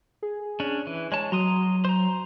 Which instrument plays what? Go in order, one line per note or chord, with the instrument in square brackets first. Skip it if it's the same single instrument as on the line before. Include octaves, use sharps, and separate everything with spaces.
[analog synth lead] G#4
[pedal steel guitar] C#4 D4
E3
[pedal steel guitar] G#3 A5 [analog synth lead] C#5
[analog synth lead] F#3 [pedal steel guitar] A#5 C6 D#6
[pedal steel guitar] C5 A#5